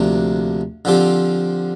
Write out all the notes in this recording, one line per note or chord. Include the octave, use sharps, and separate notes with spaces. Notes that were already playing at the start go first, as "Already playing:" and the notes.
Already playing: D2 C3 F3 A#3 D4
D3 F3 C4 G4